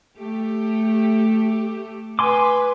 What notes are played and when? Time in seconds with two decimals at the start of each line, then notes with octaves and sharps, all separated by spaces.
0.15 A3 G4
2.19 B4 G#5 C6 D6